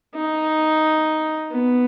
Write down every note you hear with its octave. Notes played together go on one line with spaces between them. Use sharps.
D#4
B3